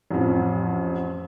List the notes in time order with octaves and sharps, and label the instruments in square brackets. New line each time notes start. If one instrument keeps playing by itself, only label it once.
[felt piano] A1 F2